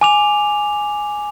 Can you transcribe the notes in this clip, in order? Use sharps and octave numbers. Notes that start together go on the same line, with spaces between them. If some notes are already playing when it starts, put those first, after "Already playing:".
G#5 D6 F7